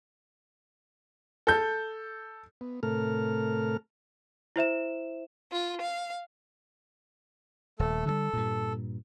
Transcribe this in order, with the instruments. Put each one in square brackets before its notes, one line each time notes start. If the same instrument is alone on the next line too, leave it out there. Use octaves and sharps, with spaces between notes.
[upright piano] A4 G6
[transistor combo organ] B3
A2 C3 A3 A4 A#4 F6
[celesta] E4 C5 E5 E7
[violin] F4
F5
[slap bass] D#1 [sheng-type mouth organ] A3 A4
[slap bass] D3 F3 G3 [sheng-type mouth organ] A4
[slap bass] G2 A#2